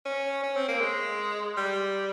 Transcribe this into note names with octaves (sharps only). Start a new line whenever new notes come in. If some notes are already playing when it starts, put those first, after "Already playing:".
C#4
C#4
C4
A#3
G#3
G3